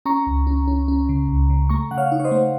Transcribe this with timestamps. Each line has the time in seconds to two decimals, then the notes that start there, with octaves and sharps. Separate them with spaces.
0.05 C#4 A#5 C#6
0.27 C#2
0.47 C#4
0.68 C#4
0.88 C#4
1.09 C#3
1.28 C#2
1.50 C#3
1.69 A3 A#5 C#6
1.91 C#3 F#5
1.98 C#5 F5
2.12 D#4
2.20 C#5
2.24 C5 D#5
2.31 A3